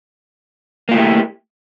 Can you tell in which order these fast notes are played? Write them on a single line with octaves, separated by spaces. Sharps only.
A#3 F4 A3 E4 G4